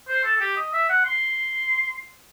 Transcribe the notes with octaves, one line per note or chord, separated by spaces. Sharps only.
C5
A4
A4
G4
D#5
E5
F#5
C6